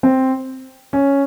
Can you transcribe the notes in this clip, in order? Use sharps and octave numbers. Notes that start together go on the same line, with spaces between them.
C4
C#4